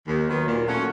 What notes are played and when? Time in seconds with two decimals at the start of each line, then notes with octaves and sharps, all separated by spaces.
0.08 D#2
0.27 D#3 F#3 B3
0.47 A#2
0.66 F#3 A3 C#4 F4